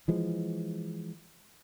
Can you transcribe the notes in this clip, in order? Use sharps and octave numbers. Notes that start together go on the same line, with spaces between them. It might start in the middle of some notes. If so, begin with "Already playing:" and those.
E3 F3 G#3